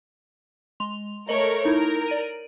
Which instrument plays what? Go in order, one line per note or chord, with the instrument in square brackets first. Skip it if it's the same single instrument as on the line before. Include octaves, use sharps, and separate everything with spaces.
[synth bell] G#3 C6 F7
[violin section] A3 A#4 C#5 [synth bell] D#5 F#7
[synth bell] D#4 E4 C#5 [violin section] A#4
[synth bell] D5 D7 D#7